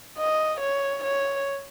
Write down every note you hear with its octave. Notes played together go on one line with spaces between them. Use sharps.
D#5
C#5
C#5